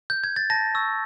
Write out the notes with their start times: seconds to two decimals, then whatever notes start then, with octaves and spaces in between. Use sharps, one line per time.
0.10 G6
0.24 G#6
0.36 A6
0.50 A5 A#6
0.75 C#6 E6